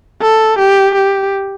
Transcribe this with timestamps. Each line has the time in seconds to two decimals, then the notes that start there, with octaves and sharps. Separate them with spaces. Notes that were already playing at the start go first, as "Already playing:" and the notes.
0.22 A4
0.59 G4
0.95 G4